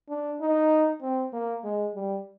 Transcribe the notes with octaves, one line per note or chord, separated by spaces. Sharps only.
D4
D#4
C4
A#3
G#3
G3